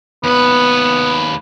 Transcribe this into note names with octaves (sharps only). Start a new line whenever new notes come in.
D#2 B3 B4